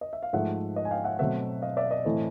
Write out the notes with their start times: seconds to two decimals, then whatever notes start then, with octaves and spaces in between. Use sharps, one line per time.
0.01 D#5
0.13 E5
0.23 F5
0.33 G#2 F3 A3 E5 F#5
0.76 D#5
0.85 G#5
0.91 F5 G5
1.04 E5 F#5
1.19 B2 F#3 A3 C4 E5 F#5
1.62 D#5 F5
1.77 D5 E5
1.91 D#5
2.05 A2 E3 A3 C4